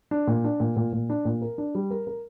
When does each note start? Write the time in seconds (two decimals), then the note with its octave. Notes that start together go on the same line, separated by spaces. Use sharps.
0.11 D4
0.27 A#2
0.44 D4
0.60 A#2
0.77 A#2
0.93 A#2
1.10 D4
1.25 A#2
1.42 A#4
1.58 D4
1.75 G3
1.91 A#4
2.07 A#4